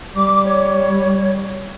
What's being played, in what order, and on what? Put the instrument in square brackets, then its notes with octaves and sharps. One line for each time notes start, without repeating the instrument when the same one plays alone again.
[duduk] G3 [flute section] D6
[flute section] C#5